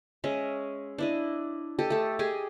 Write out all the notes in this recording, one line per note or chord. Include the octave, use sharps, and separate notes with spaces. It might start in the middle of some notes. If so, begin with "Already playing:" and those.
G#3 C#4 D#5 E5
D4 E4 D#5
G4 A4 D#5
A3 A4
G4 G#4 D#5 G#5